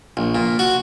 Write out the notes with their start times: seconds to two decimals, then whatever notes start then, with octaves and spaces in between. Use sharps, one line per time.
0.17 A#1
0.35 A#2
0.59 F#4